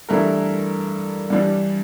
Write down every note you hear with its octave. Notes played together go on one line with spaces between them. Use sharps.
G2 E3 A3 E4 A#4
G2 E3 G3 D4